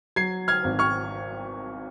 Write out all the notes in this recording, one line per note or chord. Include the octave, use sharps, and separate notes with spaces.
F#3 G#6 C7
F6 G#6
G#1
C#6 F6